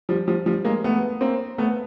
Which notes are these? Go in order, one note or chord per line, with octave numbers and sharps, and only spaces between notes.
F3 G3
F3 G3
F3 G3
G#3 A#3
A3 B3
A#3 C4
A3 B3